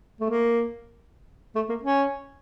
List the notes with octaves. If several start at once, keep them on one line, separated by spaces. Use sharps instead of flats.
A3
A#3
A3
A#3
C#4